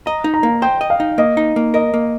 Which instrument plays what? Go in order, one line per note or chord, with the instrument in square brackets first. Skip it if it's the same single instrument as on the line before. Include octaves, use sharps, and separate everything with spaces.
[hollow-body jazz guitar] D#5 [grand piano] A#5
[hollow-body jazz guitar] D#4
[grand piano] A#5
[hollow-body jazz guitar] A#3
[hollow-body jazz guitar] C5 [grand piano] G5
[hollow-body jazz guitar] D#5
[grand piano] F5
[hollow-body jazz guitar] D#4
[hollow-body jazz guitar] A#3 [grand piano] D#5
[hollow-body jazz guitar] D#4
A#3
[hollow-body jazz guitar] A#4 [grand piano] D#5
[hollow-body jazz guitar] A#3